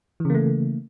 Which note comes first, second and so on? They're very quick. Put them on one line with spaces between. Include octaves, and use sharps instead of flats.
E3 C#3 A#3 A3